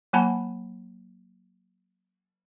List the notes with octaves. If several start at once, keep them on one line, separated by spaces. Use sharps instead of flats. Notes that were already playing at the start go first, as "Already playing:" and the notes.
F#3 A#3 F#5 G#5 A5 B5